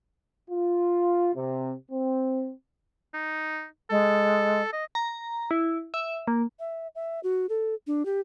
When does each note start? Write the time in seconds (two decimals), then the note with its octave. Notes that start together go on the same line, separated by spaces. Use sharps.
0.51 F4
1.34 C3
1.91 C4
3.14 D#4
3.90 G#3 A4
4.73 D#5
4.95 A#5
5.51 E4
5.94 E5
6.27 A#3
6.59 E5
6.95 E5
7.23 F#4
7.49 A4
7.87 D4
8.05 G4